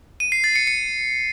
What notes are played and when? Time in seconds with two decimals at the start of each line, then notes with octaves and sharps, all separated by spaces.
0.20 D#7
0.32 C7
0.44 A6
0.56 C#7
0.67 C#7